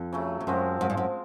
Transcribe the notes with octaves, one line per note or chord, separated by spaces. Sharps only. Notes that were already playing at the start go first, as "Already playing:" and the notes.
Already playing: F2
C#3 F#3 A3
F2
F#2 F3 G#3 C4
F#2 F3 G#3 C4
G2
F#2